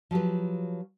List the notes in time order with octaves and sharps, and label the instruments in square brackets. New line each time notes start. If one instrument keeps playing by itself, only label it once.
[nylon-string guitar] F3 F#3 G4 B4